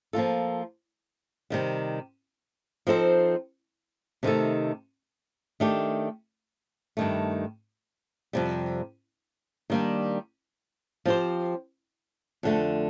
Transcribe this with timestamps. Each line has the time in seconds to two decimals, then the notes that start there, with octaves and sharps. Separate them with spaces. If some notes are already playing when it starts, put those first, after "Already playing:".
0.13 F3 A#3 F4 A4
1.50 C3 D#3 G3
2.87 F3 C4 D#4 A4 C5
4.23 C3 D#3 A3 D#4 A4
5.60 D#3 A3 D4 G4
6.97 G2 D#3 A3
8.33 F2 C3 G3
9.70 D#3 G3 A#3 D4
11.05 F3 C4 G4 C5
12.43 F2 D3 A3